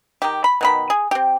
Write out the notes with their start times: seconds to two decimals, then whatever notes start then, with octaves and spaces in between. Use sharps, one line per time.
0.22 D#3 G4
0.44 B5
0.61 B2 D#3 B5
0.90 G#4
1.11 C4 G4